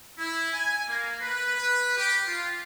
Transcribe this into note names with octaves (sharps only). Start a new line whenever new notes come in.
E4
G#5
A#3
B4
B4
G4
F4